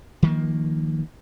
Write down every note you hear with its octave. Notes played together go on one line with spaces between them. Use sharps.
D#3 F3 A#3